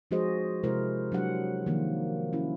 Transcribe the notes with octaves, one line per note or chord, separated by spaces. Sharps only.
F3 G#3 F#4 G#4 C5 D#5
C3 G#3 E4 A#4 C5
F#3 D4 G4 F#5
D#3 F3 A#3
C#4 E4